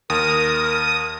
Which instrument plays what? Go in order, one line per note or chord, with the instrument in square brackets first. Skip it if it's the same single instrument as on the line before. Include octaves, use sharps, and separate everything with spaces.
[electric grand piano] D#2 [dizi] A#4 [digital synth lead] D#6